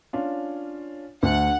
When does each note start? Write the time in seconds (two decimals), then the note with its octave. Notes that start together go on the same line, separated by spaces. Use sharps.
0.13 C#4 D4 F4
1.23 D2 A3 F#5